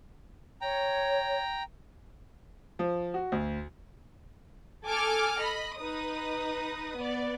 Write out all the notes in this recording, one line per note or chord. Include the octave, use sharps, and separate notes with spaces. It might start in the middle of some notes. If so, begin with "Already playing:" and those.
C#5 G5 A#5
F3
F#4
D2
A4 G#5 D6 F6
D#5 B5
D#4 B4 D#6
B3 D5